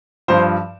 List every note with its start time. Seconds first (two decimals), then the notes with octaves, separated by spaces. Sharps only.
0.28 G2 F3 C5